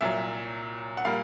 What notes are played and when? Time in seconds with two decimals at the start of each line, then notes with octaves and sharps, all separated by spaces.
0.01 C2 A#2 F#3 E5
0.97 F#5
1.05 A#2 G3 A#3 F5